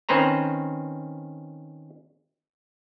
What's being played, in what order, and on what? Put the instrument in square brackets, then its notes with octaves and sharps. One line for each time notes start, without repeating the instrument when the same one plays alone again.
[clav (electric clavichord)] D#3 C4 C#4 B4 C5 A#5